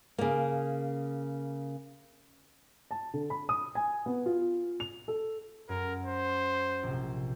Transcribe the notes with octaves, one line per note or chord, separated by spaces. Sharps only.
C#3 A#3
A5
D3
B5
D#6
G#5
B3
F4
F7
A4
F#2 A#4
C5
A#1 C3